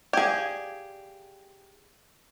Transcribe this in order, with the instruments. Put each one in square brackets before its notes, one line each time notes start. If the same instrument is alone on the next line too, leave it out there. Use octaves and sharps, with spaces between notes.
[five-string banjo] G4 G#4 [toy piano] D5 F5